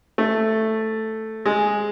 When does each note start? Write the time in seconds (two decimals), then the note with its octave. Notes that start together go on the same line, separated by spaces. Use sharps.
0.18 A3
1.46 G#3